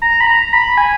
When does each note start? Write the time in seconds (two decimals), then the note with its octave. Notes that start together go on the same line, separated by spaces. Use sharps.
0.02 A#5
0.21 B5
0.27 A#5
0.53 B5
0.78 G#5